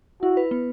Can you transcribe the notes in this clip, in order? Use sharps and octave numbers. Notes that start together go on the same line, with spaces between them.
E4 F#4
B4
B3